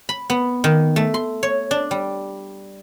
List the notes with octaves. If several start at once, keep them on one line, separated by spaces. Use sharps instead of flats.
B5
B3
D#3
A3
C6
C#5
D4
G3